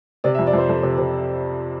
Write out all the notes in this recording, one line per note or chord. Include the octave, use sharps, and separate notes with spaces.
C3 D5
E5
F2
D5
F2 C5
F2 A4
C3
C3